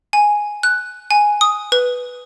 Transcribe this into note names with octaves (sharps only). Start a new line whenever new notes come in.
G#5
F#6
G#5
D#6
B4